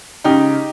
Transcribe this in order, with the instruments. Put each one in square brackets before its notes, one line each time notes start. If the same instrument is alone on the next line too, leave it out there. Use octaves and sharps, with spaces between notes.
[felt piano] C#2 C#3 D#4 G4